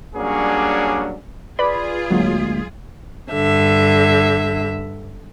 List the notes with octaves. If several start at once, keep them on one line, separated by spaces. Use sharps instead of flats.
F#3 G3 A#3 C#4 D4 G#4
F4 G#4 B4 D5 B5
D2 F#3 G#3 A#3
G2 D3 E5